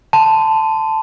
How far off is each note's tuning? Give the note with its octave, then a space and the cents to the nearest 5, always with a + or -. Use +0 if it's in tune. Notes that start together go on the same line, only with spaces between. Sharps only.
A5 +0 C6 -25